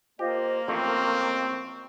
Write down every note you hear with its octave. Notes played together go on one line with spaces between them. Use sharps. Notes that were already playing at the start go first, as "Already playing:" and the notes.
A#3 F4 G4 C5 D#5
A1 F2 C4 C#6